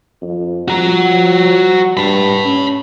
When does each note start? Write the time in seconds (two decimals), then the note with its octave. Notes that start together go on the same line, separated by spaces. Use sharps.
0.22 F2
0.68 F3 F#4 A#5
1.97 G2 A5 B5
2.45 C#4